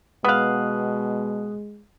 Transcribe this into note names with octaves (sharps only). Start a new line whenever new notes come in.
B2 G#3 B3 F5 D#6 F#6